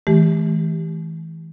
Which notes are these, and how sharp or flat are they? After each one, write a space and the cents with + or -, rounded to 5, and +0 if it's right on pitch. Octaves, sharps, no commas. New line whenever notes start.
E3 -25 A3 -40 G4 +0